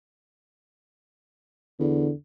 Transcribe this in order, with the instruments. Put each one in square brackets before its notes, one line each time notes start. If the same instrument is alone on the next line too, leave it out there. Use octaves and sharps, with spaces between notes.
[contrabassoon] E2 [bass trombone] D3